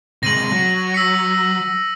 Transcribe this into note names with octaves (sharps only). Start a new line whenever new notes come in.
C3 G#3 A#6 D#7 F#7
F#3
E6 B6 C#7